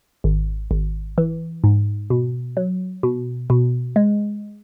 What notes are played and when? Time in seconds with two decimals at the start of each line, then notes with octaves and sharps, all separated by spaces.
0.24 G#1
0.71 G#1
1.18 E3
1.64 G#2
2.10 B2
2.57 F#3
3.03 B2
3.50 B2
3.96 G#3